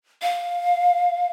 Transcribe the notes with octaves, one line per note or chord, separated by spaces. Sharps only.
F5